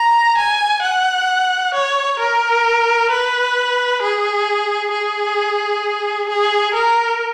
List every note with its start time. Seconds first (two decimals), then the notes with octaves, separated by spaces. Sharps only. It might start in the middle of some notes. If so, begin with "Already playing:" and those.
Already playing: A#5
0.37 G#5
0.83 F#5
1.74 C#5
2.20 A#4
3.10 B4
4.02 G#4
4.92 G#4
6.30 G#4
6.74 A#4